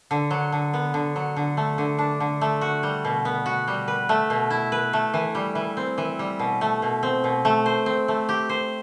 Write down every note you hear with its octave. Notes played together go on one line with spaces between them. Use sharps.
D3
F#3
D3
B3
D3
F#3
D3
A3
D3
D4
D3
A3
F#4
G3
B2
B3
F#4
G3
B4
A3
B2
E4
B4
A3
E3
G3
E3
C4
E3
G3
B2
A3
B2
C4
B2
A3
C5
C4
A3
G4
C5